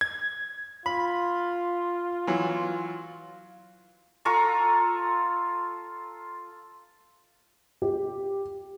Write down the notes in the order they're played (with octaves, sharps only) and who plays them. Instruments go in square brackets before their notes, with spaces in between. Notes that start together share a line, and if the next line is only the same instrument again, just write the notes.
[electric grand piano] G#6
[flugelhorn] F4 [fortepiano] B5
[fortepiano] E3 F#3
[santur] F4 A4 A#5 C#6
[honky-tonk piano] G4